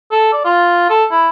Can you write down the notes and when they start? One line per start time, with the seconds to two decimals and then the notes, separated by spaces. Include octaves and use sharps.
0.12 A4
0.33 D5
0.45 F4
0.90 A4
1.11 E4